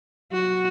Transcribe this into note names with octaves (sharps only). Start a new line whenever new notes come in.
F#3 F#4